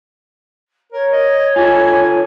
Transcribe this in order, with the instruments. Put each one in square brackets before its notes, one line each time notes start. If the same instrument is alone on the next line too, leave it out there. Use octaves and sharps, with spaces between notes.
[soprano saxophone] A#4 [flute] C#5
[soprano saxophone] D#5
[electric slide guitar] F4 G4 A4 [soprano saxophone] G#5